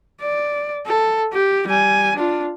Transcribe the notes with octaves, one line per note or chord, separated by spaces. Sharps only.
D5
A4
G4
G3 G#5
D4 F4